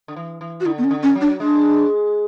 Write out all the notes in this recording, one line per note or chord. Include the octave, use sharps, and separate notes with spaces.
D3
E3
E3
F#4
D3 E4
B3
C#4
D3
C#4
F#3
D4
G#3 D4